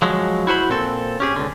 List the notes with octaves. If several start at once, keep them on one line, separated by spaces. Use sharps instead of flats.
F3 F#3 G#3
E4 F#4 C5 B5
A#2 C4 A4
C#4 G4 G#4
C#2 D3